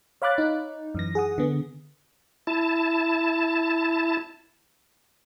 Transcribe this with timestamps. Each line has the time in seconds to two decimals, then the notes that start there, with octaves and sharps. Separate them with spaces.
0.22 C#5 F5 B5 D6 F#6 A6
0.38 D#4
0.95 F#2 E3 A#6
1.15 G#4 F#5 D#6
1.38 D3 B3
2.47 E4 A5